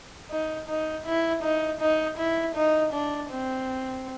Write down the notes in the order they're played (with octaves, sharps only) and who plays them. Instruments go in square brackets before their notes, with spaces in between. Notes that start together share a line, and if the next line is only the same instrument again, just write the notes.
[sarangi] D#4
D#4
E4
D#4
D#4
E4
D#4
D4
C4